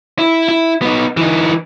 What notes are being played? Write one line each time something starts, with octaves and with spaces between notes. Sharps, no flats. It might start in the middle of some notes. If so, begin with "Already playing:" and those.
E4
E4
B3 D#4
E3 D#4